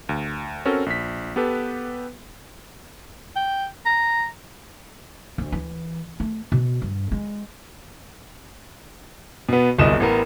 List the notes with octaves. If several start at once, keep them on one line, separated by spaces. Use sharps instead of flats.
D2
C4 C#4 F#4 A4 A#4
A#1 B6
B3 G4 A4 B4
G5
A#5
D2
E3
A3
B2
G2
G#3
B2 B3
D1 G1 C2 D#5 E7
A1 B3 A#4